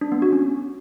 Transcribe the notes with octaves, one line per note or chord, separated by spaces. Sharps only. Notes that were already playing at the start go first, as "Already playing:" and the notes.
D4
B3
F#4
C#4